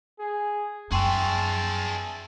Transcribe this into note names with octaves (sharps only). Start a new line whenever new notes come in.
G#4
F#2 G#4 E5 G5 A5 C6 C#6